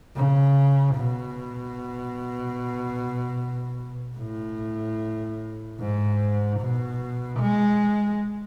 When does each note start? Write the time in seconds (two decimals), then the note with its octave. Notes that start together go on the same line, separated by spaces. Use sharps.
0.16 C#3
0.96 B2
4.18 A2
5.80 G#2
6.60 B2
7.40 G#3